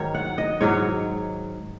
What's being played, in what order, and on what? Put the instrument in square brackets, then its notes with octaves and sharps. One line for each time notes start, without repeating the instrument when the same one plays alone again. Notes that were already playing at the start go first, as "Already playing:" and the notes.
Already playing: [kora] G#2 D#3 F#3 C#5
F#5
D#5
G#2 F#3 C#5